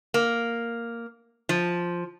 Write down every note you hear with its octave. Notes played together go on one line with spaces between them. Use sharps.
A#3
F3